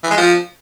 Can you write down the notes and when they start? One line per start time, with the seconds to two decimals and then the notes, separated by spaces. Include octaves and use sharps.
0.04 E3
0.10 G#3
0.17 F3